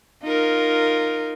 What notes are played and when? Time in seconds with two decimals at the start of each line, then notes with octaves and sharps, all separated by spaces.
0.23 D#4 F4 A#4